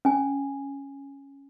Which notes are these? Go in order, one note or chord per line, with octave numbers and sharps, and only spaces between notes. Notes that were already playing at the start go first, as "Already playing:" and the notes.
C#4 G#5